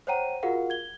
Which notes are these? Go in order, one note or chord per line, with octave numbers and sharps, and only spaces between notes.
C5 C#5 F#5 G5 A#5 D#7
F4 F#4 G#4 A#4 F5 F#5
G#6 G7